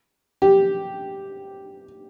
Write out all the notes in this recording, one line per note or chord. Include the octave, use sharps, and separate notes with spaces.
G4